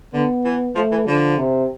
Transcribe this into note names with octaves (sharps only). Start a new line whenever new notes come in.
D3 B3
E3
F3 A3
E3
D3 F3
C3